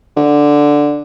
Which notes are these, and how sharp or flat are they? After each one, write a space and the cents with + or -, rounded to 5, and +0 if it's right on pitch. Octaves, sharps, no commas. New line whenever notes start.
D3 +0